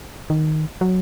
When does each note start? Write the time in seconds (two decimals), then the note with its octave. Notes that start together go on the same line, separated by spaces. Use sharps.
0.30 D#3
0.81 F#3